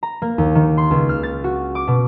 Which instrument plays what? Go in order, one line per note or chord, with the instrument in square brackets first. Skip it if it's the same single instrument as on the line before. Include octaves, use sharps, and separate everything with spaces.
[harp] A#5
A#3
D#2
D#3
C6
C#2
F6
A6
F#4
D6
B2